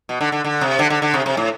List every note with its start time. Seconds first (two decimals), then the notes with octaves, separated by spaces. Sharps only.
0.09 B2
0.21 D3
0.32 D3
0.44 D3
0.61 C3
0.79 D3
0.90 D3
1.02 D3
1.14 C3
1.26 C3
1.37 A2